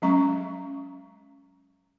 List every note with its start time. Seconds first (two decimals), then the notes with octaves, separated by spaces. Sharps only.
0.02 F#3 G#3 C#4 A#5 C#6